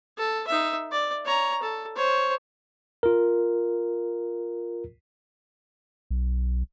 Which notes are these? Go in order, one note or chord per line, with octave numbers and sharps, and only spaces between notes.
A4
D#4 E5
D5
C#5 A#5
A4
C5 C#5
F4 A#4
B1